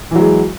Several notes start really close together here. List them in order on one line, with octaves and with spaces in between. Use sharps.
E3 F#3 G#3